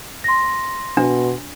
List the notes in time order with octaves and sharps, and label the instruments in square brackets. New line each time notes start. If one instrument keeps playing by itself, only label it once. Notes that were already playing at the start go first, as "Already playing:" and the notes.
[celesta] C6 A#6
[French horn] B2 [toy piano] D4